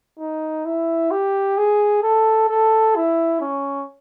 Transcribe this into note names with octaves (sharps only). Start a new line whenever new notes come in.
D#4
E4
G4
G#4
A4
A4
E4
C#4